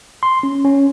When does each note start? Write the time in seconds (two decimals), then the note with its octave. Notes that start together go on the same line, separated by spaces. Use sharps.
0.23 C6
0.43 C#4
0.65 C#4